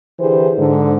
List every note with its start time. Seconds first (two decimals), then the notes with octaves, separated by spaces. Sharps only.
0.20 D3 E3 G4 G#4 C5
0.58 G#2 D3